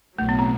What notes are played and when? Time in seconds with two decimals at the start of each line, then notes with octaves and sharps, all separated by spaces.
0.18 B1 A2 F#3 A3
0.29 B3
0.39 C4